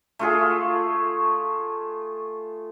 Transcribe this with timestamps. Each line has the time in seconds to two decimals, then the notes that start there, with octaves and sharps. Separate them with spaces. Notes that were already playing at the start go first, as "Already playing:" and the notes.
0.19 A3 F4 G#4